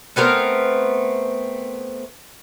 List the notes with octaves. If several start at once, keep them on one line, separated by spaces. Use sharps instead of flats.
A3 B3 C4 A#4